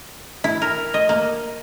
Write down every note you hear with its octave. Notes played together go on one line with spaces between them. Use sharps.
E4
A#4
D#5
A#3